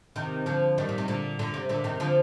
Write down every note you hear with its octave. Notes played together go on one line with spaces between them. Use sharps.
C3 D#3
D3 F3
D#3 G3
A#2
C3
A#2 D3
A#2 D3
C3
A#2 D3
C3 D#3
D3 F3